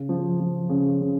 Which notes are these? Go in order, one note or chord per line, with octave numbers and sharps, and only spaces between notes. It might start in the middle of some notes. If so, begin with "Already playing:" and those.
Already playing: C#3
F3
F3
C#3
C#3